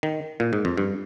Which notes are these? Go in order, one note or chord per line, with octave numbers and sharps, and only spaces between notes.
D#3
A#2
G#2
F2
G2